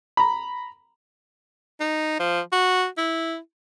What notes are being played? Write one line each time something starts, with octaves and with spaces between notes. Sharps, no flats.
A#5 B5
D#4
F3
F#4
E4